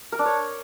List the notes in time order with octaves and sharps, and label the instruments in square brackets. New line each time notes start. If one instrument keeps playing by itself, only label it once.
[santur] A#4
D4
C#5